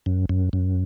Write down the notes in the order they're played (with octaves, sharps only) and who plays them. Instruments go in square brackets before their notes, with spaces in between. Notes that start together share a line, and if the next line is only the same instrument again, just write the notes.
[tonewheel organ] F#2
F#2
F#2